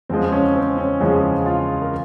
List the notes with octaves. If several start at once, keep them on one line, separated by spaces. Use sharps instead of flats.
E2 C#3 F3 G#3 C4
C#4
C4
C#4
E2 C#3 F3 G#3
F4
A#4